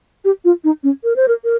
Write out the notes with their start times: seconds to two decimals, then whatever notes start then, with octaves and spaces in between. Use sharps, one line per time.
0.25 G4
0.45 F4
0.64 D#4
0.83 C#4
1.04 A#4
1.16 C5
1.28 A#4
1.44 A#4